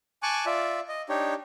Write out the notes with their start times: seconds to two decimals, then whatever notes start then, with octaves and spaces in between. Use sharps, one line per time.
0.23 G#5 A5 C#6 D6 F#6
0.46 F4 D5 E5
0.88 D#5
1.09 D4 D#4 G4 C#5